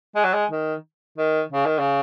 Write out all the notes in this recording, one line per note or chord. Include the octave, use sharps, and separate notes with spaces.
G#3
F#3
G#3
D#3
D#3
C#3
D#3
C#3